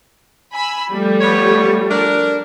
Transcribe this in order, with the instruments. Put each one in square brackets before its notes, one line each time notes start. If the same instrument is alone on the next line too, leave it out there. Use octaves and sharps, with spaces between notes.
[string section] G#5 B5 E6
F3 G3 A3
[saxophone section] B3 B4 C#5
D4 A#4